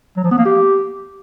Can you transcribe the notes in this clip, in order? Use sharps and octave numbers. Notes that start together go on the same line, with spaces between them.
F#3
F3
B3
A#3
G4